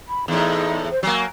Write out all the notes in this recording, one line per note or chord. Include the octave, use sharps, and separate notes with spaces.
B5
E2 A2 D#4
C5
F#3 A#3 G#5